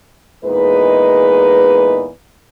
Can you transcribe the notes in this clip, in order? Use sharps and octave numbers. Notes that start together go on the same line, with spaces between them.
E2 A#2 G#3 D#4 B4